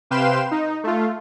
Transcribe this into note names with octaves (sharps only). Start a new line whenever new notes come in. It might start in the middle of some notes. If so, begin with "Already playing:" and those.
C3 B4 F5 G5 C6 E7
D#4
A3 F4